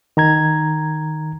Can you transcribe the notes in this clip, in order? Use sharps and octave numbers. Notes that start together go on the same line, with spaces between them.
D#3 A#5 G#6